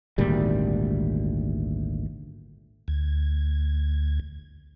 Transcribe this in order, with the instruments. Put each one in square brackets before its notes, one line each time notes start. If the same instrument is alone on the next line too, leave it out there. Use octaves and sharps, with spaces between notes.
[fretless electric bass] G#1 D2 A#2 G3
[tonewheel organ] D2 G#6